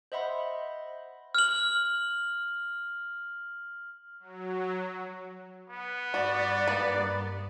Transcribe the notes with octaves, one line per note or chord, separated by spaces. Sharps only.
C5 D#5 E5 F#5 B5 C6
F6 F#7
F#3
B3
G2 F#4 D5
A#3 B4